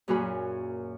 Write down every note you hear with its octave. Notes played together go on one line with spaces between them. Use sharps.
F#2 A#2 F#3 F#4 G#4 B5